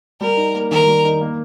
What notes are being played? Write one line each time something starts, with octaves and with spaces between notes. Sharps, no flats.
G3 A#4
D#4
A#3
D#3 A#4
G3
D#4
A#3